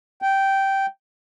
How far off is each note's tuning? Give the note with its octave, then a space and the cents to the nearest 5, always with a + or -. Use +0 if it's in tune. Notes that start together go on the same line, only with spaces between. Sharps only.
G5 -10